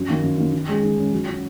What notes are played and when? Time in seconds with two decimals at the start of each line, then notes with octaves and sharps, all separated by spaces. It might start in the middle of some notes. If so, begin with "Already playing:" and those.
Already playing: F#2
0.09 D#3 A#3
0.23 F#2
0.37 D#3 A#3
0.52 D#3
0.68 G#3 C#4
0.83 D#3
0.98 G#3 C#4
1.12 F#3
1.27 C#4 F#4